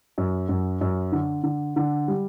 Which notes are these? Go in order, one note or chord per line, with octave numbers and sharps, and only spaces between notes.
F#2
F#2
F#2
D3
D3
D3
G3